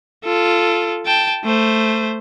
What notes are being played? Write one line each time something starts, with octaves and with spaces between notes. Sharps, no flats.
F4 A4
G5 A5
A3 C5